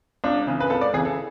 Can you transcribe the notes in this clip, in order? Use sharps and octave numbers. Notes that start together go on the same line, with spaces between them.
C#2 D4
C#3 E3
B4
C#2 A4
D5
C#3 E3 G#4
A4